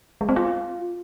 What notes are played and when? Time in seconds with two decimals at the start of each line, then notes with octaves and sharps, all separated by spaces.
0.21 G#3
0.29 C4
0.36 F4